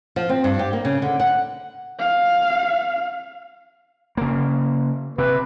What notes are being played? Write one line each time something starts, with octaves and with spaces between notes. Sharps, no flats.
F3
C4
G2
G4
A#3
C#3
D3
F#5
F5
C#3 A#3
C3 B4